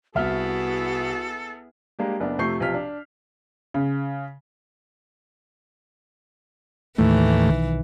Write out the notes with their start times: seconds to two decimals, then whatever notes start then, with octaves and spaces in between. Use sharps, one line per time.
0.15 C2 B3 E4 F#4 G#4 A4 E5 F6
1.99 G3 G#3 A#3 D4 G4
2.20 F#1 B3 D4
2.39 F2 C3 A3 C#6 G6 C7
2.60 B1 C3 F3 F6 B6
2.74 D4
3.74 C#3
6.98 D#2 A2 E3 A3
7.48 B1 D#3